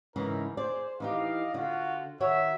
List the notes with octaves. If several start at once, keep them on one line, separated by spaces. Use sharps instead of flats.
G#2 C#3 E3 D#4 E4 A#4
G#4 C5 D5
E3 D#4 G4 D5 D#5 F5
D3 F4 F#4
D#3 F#4 C#5 E5